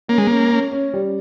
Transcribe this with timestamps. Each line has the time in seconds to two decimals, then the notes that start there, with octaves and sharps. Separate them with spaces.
0.08 A#3 C#4
0.18 G#3
0.27 A#3 C#4
0.51 C#4
0.72 C#4
0.93 G3